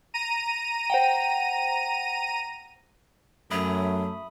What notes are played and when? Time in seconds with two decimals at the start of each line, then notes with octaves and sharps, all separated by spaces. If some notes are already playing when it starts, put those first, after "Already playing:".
0.14 A#5 D#7
0.90 C5 F#5 G5
3.51 F#2 F#3 A3 E5 B5 D#6